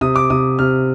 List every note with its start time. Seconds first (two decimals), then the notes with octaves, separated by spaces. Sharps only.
0.01 C3 D#6
0.16 D6
0.30 C3 D#6
0.59 C3 F6